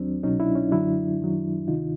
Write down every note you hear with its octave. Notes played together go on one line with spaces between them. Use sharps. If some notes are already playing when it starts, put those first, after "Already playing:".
Already playing: D#2 F#3 C4 D4
C2 B2 F#3 C#4 D#4
D4 E4
C#4 D#4
F#2 D3 F#3 D4 E4
F#2 D#3 F#3
D2 C3 D#3 D#4 F4